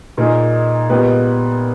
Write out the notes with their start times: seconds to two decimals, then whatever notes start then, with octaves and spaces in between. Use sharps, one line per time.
0.18 A#2 A#3 D#4 G#4
0.89 A#2 G#3 B3 G4 B4